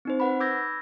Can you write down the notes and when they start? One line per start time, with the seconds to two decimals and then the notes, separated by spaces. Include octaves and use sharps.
0.05 C4 D#4 C5
0.20 B4 F#5 B5
0.40 B5 D6 E6 G6 G#6 A#6